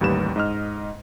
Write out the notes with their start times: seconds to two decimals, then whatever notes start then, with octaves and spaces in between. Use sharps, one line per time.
0.01 A1 D#2 G3 B4 E7
0.36 G#2 D#5 F6